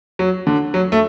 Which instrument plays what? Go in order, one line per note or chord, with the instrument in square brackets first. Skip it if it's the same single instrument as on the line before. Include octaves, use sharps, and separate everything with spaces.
[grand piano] F#3
D3
F#3
A3